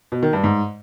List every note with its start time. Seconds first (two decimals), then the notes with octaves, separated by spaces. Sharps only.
0.12 B2
0.22 D#3
0.33 G2
0.44 G#2